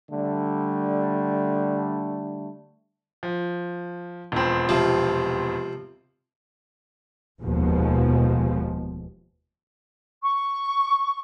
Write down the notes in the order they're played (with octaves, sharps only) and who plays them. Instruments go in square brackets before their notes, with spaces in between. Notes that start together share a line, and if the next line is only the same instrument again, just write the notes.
[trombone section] D3 G3 A3
[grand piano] F3
E1 F2 C4
[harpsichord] C3 F3
[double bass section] F1 D#2 B2 F3 G#3
[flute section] C#6